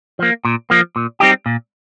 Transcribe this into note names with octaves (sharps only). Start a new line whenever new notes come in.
F3 A#3
A#2
F3 A#3
A#2
G3 C4 D#4 G4
A#2